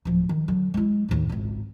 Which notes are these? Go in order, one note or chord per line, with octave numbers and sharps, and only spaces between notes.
D1 F3
D#3
D3 F#3
G#3 E4
D#2 A2
G#1 C#2